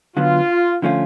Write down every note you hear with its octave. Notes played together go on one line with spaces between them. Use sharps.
D3 F#3 B3 F4
D3 F3 A3 C#4 F4